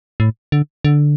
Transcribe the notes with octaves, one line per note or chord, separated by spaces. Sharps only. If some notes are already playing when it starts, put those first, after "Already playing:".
A2
D3
D3